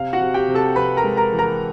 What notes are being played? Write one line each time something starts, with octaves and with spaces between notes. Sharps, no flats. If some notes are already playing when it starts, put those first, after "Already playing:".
Already playing: C3 F5
F#4 F#5
C3
G4 G5
C3
A4 A5
C3 B4 B5
A#4 A#5
G#3
A#4 A#5
E3
A#4 A#5